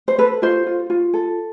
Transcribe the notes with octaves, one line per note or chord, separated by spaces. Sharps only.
C5
A4 B4
F4 C5
F4
F4
A4